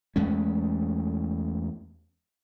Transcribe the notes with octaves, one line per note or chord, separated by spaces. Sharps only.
E2 G#3 A3 C#4